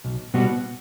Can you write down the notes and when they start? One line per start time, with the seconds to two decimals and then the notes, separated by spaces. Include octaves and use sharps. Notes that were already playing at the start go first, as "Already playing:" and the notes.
0.04 B1
0.34 B2 G3 B3 F#4